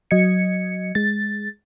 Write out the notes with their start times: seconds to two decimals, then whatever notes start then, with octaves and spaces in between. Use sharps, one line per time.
0.11 F#3 D#5 G#6 C#7
0.95 G#3 A6